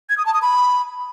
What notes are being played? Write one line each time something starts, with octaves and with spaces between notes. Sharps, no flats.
G#6
D#6
A5
D#6
B5